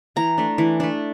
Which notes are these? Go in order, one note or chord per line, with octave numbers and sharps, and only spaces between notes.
E3 A#5
A3 D4
E3
A3 D4